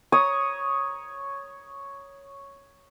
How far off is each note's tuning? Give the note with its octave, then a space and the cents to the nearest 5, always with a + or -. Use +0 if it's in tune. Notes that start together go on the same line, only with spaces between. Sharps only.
C#5 +0 A#5 +25 D#6 +0